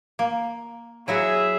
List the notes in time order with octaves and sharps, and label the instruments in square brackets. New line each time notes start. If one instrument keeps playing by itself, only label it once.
[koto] A#3
[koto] F#3 E4 F#4 [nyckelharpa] G#4 E5